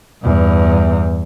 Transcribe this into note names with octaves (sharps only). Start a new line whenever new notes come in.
E2 G2